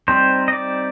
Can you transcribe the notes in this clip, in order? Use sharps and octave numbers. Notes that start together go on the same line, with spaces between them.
G3 C4 D#4 C5
D#5
D5